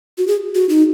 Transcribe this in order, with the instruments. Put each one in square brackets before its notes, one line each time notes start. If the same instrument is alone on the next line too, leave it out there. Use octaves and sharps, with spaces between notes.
[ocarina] F#4
G#4
F#4
D#4